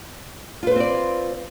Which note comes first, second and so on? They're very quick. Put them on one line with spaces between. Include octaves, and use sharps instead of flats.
F4 B4 C5 C4 D5